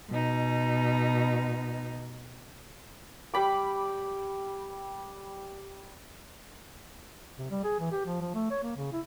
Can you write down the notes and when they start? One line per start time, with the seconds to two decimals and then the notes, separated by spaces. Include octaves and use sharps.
0.11 B2 D#4
3.34 G3 G5 B5 D6
7.38 C3
7.50 G3
7.64 G#4
7.80 E3
7.92 G4
8.06 F3
8.21 F3
8.34 A3
8.50 C#5
8.63 A#3
8.76 C#3
8.92 E4